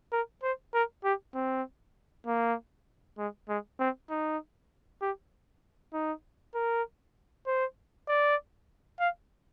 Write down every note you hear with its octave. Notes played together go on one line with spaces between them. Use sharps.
A#4
C5
A#4
G4
C4
A#3
G#3
G#3
C4
D#4
G4
D#4
A#4
C5
D5
F5